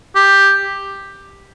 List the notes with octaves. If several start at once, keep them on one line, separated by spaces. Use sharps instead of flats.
G4